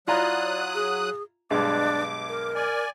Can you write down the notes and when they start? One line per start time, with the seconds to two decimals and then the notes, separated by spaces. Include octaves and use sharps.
0.07 F#3 E4 F4 D5 A#5 D#6 F#6
0.74 G#4
1.50 B1 G2 G#3 D4 D6
2.29 A#4
2.55 D5 G#5